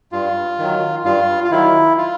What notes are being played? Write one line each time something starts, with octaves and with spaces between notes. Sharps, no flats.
G2 F4
D#3 F#3
G2 F4
F4
D#3 F#3 E4
F4